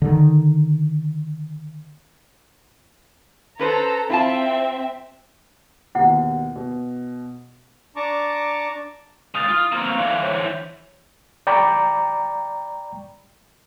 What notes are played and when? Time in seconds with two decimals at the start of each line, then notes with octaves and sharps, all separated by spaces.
0.02 D3 D#3
3.59 C#4 A4 B4 C5 A#5
4.10 C4 E4 F4 E5 A5
5.95 D#2 B2 E4 F#5
6.56 B2
7.96 D4 A5 A#5 C#6 D6
9.35 G#3 F5 D#6 F6 A6
9.49 F4
9.72 A#3 C4 F6
9.85 F5 C#6 F7
9.99 D3 E3
10.23 C5 C#5 G6
11.47 D5 G5 A#5 B5 C#6 D6